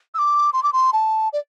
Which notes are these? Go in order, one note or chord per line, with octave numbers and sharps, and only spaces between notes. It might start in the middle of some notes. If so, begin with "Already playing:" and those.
E6
D6
C6
D6
C6
A5
D5